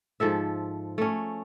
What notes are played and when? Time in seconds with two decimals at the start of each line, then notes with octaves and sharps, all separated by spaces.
0.20 G#2 F3 A4 E5
0.98 A3 C#4